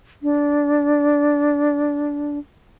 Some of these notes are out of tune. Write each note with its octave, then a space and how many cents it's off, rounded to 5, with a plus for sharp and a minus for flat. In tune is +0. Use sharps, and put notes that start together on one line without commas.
D4 -15